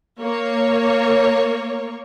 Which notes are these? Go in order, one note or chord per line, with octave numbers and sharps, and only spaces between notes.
A#3 C#5